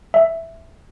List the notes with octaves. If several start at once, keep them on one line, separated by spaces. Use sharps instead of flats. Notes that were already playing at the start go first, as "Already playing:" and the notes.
E5